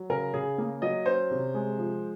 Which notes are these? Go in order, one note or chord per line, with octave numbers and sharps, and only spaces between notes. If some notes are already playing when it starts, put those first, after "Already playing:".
Already playing: F#3
C#3 A#4
C#3 G#4
A#3
F#3 D#5
C#4 C5
C3
G#3
F3